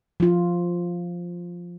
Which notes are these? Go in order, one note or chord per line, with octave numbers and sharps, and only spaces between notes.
F3 F4